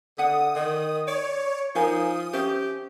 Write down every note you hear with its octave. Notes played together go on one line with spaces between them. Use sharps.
D3 E5 F#5 D#6
D#3 G5
C#5 D5
F3 D#4 A#4 G#5 D#6
C#4 G4 C5 E5